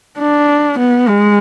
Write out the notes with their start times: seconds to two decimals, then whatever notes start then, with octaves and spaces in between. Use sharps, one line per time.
0.19 D4
0.79 B3
1.09 G#3